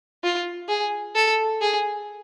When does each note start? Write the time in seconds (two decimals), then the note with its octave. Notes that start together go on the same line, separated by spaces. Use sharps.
0.24 F4
0.69 G#4
1.16 A4
1.61 G#4